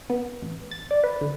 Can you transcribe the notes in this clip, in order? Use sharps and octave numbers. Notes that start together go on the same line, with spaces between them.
B3
A1
A6
D5
B4
D3